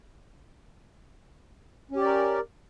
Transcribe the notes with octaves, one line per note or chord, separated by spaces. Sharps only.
C#4 G4 A#4 D5